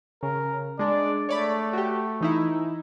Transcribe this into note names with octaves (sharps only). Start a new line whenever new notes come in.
C#3 A#4
G#3 D4 D5
A3 C#5 D5 B5
F#4 G4
E3 D#4 E4